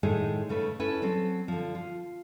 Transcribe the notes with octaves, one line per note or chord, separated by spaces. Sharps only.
A2 D#3 G#3 A3 D#4 G#4
C#3 A3 B4
C#4 E4 A4 B4
F#3 C4 A4
D3 F3
F4